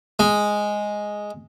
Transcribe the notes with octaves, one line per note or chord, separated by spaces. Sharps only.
G#3